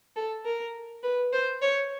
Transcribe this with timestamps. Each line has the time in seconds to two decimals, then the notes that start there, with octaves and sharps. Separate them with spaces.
0.16 A4
0.45 A#4
1.03 B4
1.33 C5
1.62 C#5